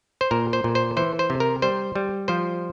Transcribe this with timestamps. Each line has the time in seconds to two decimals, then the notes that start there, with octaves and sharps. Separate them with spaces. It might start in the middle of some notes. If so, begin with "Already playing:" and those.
0.21 C5
0.31 A#2 A#4
0.53 C5
0.64 A#2
0.75 C5
0.97 E3 C5
1.19 C5
1.30 C3
1.40 A#4
1.62 G3 C5
1.95 G3
2.28 F3 C5